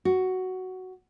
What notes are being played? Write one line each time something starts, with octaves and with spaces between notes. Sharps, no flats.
F#4